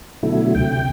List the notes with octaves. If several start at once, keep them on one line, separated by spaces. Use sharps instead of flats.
B2 D3 F#3 A3 E4
D2 C3 G5